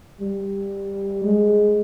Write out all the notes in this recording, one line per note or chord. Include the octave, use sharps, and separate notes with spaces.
G3
G#3